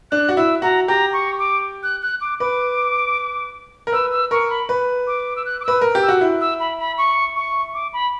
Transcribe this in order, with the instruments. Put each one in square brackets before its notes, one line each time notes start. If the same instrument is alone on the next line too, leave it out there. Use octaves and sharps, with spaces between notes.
[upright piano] D4 [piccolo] F#6
[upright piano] F#4
[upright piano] E4 [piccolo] E6
[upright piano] F#4 [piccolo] A#5
[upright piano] G4 [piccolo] A#5
[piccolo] C#6
D6
F#6
F#6
D6
[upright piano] B4 [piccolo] D6
[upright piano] A#4
[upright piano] B4 [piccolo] E6
[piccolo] E6
[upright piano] A#4 [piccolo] C#6
[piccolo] B5
[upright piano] B4
[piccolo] D6
E6
F#6
D6
[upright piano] B4 [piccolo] E6
[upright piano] A#4
G4
[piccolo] E6
[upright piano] F#4
E4
[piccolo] E6
B5
B5
C#6
C#6
D6
B5